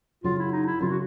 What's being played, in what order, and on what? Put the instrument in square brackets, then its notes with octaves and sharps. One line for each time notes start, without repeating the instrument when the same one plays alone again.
[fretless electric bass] F#2 C#3 F#3 [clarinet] F4
[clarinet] E4
D#4
E4
[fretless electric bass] F#2 C#3 F#3 [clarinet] F4
[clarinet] F#4